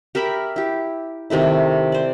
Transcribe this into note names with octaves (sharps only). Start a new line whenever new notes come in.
G4 A#4 E5 B5
E4 G4
C3 D#3 A3 E4
C5 D5